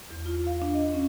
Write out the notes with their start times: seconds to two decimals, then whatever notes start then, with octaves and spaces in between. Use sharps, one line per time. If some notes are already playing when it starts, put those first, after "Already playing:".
0.10 E2
0.26 F4
0.47 F5
0.62 D4
0.74 D#5
0.93 C#4